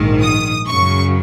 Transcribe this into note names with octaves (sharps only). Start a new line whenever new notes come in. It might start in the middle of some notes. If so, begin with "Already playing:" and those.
Already playing: A#1 G#2 D#3
D#6
F#2 C#3 F#3 C#6